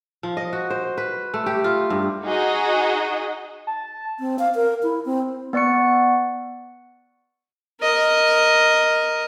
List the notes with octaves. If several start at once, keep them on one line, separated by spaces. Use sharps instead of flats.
F3
D#5
F#4
C5
B4
A3
G4
F4
G2
D#4 F#4 G#4 D#5
A5
C4
F5
A#4
E4
C4
B3 D5 F#5 C#6 C#7
A#4 D#5